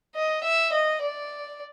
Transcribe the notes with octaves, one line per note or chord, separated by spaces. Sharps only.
D#5
E5
D#5
D5